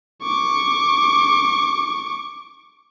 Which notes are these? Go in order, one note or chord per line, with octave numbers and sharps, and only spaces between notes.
C#6 D6